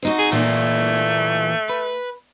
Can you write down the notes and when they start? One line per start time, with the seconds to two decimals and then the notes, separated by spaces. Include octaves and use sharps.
0.03 C4 D#4 F#4
0.19 G#4
0.32 A#2 E3 A3 A#3
1.69 B4